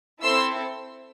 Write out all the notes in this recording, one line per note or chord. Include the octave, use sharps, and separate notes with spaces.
C4 E4 A4 C6 E6